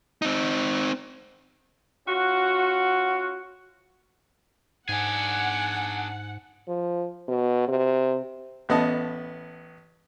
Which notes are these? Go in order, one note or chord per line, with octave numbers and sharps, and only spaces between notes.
C4 D#4
C#4 F4 F#4
G#2 D4 G#4 F#5 G#5
F3
B2
C3
A1 B3 D#5 A5